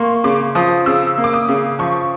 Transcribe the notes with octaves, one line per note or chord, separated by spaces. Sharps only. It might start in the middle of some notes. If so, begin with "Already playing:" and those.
Already playing: A#3 C6 C#6
C#3 D6
F3 D#6
C#3 E6
A#3
D6
D#6
C#3
F3 C#6